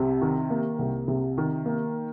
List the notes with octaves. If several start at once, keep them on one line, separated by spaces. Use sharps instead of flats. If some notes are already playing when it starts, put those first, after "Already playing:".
Already playing: C2 C3
D#3
A#3
C2
C3
D#3
A#3